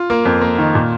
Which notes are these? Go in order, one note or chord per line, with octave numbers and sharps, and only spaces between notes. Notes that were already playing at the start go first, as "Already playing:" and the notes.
Already playing: F4
A#3
F2
A#3
D#3
A#2